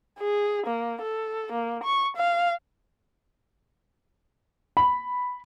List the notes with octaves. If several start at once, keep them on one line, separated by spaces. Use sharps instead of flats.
G#4
A#3
A4
A#3
C#6
F5
B5